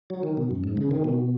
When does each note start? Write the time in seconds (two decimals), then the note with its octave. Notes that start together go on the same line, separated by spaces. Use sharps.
0.10 F#3
0.23 D#3
0.37 B2
0.51 F#2
0.64 G#2
0.77 C#3
0.91 D#3
1.04 B2